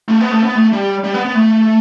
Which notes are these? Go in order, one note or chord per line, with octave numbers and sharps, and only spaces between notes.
A3
B3
A3
B3
A3
G3
G3
B3
B3
A3